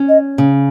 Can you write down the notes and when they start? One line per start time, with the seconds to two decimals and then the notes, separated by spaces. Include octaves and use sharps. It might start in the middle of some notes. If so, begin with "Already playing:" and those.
Already playing: C#4
0.09 D#5
0.38 C#3